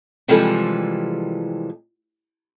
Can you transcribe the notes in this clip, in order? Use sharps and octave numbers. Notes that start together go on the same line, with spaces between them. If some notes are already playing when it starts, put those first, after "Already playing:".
C3 E3 F3 G3 G#3 A4